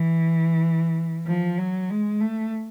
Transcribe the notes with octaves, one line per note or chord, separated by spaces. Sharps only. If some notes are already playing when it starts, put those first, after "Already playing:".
Already playing: E3
F3
F#3
G#3
A3